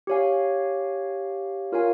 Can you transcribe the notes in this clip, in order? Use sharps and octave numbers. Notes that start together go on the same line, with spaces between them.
G4 C#5 F5 G#5
F4 A#4 C#5 F5 G#5